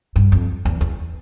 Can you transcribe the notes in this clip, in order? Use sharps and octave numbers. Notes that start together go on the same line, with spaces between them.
G2
F2
E2
E2